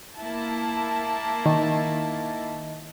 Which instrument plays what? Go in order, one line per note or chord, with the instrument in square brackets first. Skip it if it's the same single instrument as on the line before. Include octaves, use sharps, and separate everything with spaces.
[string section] A#3 E4 A5
[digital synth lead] D#3